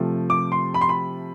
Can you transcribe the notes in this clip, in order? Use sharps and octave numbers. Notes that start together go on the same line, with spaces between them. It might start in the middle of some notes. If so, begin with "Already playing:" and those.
Already playing: C3 F3 A3
D6
C6
B5
C6
B5